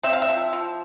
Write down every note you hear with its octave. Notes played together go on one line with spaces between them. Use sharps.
C4 E5
F5
E5
F3
F3